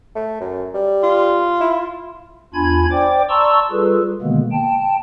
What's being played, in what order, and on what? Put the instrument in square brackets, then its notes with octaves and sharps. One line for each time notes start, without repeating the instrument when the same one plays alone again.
[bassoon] A3
F#2
G3
[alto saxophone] F4
[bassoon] E4
[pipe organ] E2 D4 F4 G#5 B5 G#6
C5 D5 G5 D6
D5 A5 A#5 C6 C#6 E6
G3 F4 G#4 A4 B4
B2 D3 D#3 G#3 A#3 B3
G5 A5